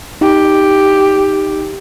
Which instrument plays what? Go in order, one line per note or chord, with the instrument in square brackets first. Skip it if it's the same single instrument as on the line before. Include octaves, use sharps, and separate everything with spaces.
[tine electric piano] D#4 [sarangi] G4